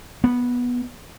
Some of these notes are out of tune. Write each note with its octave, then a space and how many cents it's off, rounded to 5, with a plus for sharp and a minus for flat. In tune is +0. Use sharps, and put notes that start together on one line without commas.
B3 -10